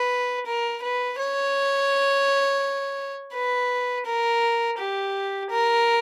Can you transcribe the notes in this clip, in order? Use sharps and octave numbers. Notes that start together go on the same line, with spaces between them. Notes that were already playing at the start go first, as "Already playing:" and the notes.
Already playing: B4
A#4
B4
C#5
B4
A#4
G4
A#4